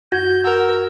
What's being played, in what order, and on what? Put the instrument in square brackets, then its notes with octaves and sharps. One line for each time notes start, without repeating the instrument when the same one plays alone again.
[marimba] F#2 G#6 A#6 [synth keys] F#4 [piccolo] G6
[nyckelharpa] A#4 [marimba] F#5 [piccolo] E6